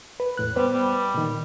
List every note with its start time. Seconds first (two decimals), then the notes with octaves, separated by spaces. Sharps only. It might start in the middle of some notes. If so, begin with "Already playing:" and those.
0.20 B4
0.37 E2 A2 F#6
0.56 G3 B3 B4 C5
0.74 G3
1.14 A#2 D#3